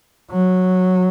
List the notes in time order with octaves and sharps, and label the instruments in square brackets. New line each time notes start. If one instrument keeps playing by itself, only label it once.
[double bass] F#3